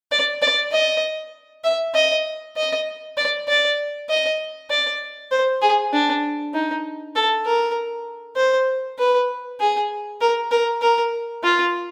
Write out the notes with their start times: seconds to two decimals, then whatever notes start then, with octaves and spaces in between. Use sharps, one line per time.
0.12 D5
0.42 D5
0.72 D#5
1.64 E5
1.95 D#5
2.57 D#5
3.17 D5
3.48 D5
4.09 D#5
4.70 D5
5.31 C5
5.62 G#4
5.93 D4
6.54 D#4
7.16 A4
7.46 A#4
8.37 C5
8.99 B4
9.60 G#4
10.21 A#4
10.51 A#4
10.82 A#4
11.43 F4